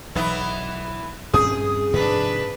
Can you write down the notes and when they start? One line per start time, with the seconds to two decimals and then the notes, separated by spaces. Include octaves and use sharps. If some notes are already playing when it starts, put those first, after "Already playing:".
0.15 B1 E3 B3 E4
1.34 G2 C4 C#4 G#4 D#6
1.93 G#2 C3 F3 D4 B4